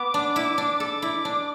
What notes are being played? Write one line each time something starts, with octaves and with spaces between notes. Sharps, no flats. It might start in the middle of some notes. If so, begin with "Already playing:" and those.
Already playing: B3 D6
D4
E4
D4
A4 D6
E4
D4